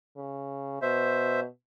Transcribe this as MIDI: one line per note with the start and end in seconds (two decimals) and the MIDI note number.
0.17 0.80 49
0.82 1.45 47
0.82 1.40 72
0.82 1.40 76